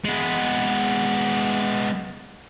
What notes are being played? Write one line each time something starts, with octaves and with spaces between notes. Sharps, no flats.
G#3 B3